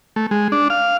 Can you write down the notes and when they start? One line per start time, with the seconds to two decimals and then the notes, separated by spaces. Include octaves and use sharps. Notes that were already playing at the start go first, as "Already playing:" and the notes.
0.16 A3
0.31 G#3
0.52 D4
0.70 F5